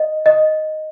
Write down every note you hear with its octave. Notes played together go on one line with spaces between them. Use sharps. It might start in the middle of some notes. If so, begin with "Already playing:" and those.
Already playing: D#5
D#5